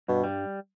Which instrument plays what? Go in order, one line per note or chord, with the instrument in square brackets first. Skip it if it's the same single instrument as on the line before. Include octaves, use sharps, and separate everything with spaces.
[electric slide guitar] G2 [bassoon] B2
[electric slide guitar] G3